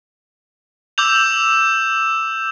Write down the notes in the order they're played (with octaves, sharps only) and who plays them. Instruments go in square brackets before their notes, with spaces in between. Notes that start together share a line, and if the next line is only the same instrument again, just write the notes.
[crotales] D6 E6 G6 F7